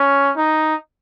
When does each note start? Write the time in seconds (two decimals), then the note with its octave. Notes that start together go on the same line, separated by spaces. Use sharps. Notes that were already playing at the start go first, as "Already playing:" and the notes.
Already playing: C#4
0.36 D#4